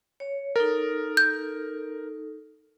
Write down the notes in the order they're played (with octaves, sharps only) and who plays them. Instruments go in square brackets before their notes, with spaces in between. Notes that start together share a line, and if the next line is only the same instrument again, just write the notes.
[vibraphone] C#5
[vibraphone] D#4 A4 [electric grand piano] A#4
[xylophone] G6